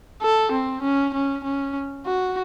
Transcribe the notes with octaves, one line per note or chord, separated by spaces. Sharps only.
A4
C4
C#4
C#4
C#4
F#4